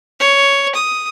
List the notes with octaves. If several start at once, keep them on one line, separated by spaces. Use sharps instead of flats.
C#5
D#6